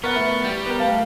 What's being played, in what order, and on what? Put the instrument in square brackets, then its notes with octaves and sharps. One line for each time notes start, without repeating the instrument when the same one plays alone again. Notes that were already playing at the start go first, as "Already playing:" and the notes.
[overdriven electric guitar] B3 [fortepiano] A#4 B4 F#5 [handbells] C#6 F6 A6
[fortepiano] A3 E4
[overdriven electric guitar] G3
[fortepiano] B3 A#4
[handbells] A3 F5 [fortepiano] A5